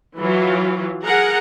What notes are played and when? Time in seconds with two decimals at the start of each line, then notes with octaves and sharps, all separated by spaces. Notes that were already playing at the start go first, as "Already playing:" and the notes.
0.18 E3 F#3 F4
1.03 G#4 A#4 F#5 A#5